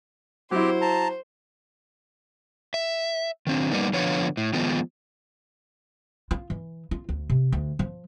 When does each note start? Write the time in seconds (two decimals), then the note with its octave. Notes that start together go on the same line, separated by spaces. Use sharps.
0.51 F#3 C4 E4 G4 C5
0.82 A5 A#5
2.74 E5
3.47 D#3 C4 D4
3.71 G3 A#3 B3 D#4
3.93 D3 F3 B3 F4 C#5
4.37 A2
4.53 D#3 F3 G#3 B3
6.31 F4
6.50 E3
6.91 F4
7.09 D2
7.30 C3
7.53 D2
7.79 F3